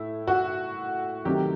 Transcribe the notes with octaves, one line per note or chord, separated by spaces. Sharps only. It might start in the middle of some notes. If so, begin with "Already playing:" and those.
Already playing: A2 A3 E4
F#4
C3 D#3 F#3 A3 G4